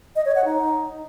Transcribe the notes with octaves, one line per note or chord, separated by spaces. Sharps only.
D#5
C#5
F#5
D#4